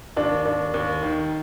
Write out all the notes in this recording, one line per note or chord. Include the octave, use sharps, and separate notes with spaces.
D#2 D4
D#2
D#2
D#3